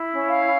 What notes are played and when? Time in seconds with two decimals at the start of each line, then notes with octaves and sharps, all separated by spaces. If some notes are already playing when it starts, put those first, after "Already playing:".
Already playing: E4
0.14 C#4
0.29 F5